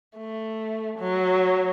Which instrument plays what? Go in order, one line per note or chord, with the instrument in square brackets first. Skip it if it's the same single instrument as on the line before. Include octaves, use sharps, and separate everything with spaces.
[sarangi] A3
F#3